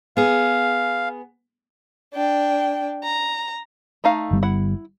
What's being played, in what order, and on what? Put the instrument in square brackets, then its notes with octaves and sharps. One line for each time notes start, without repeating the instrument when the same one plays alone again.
[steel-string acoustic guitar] B3 G#4 [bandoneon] F5
[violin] D4 G5
A#5
[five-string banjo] A3 D#4 F5
[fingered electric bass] G1 G3 B3
[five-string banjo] E4 F#5